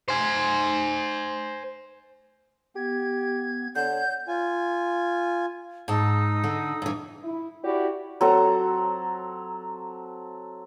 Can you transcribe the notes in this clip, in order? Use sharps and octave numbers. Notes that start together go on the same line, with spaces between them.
C5 G#5
B3 G4 G#6
D3 C#5 F#5 G6
F4 G#5
G#2 D#4 A5 D#6 E6
D3
G2 E3
E4
E4 F#4 G4 D5
F#3 C4 A4 A#5